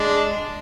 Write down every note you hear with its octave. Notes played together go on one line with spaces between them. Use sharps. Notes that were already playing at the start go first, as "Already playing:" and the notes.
Already playing: G#3 D4